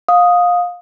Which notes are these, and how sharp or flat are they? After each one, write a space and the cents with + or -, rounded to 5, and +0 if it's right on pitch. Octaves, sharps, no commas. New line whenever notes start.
F5 +20 D#6 +0